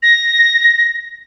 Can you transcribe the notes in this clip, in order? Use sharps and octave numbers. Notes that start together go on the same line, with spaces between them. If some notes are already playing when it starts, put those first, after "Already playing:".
A#6